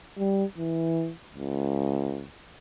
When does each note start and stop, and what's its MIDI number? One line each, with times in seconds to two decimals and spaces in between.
0.18 0.44 55
0.58 1.11 52
1.34 2.25 37